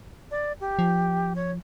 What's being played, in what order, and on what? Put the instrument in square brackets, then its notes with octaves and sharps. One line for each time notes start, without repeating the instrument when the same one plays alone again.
[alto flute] D5
G4
[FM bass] F3
[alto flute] C#5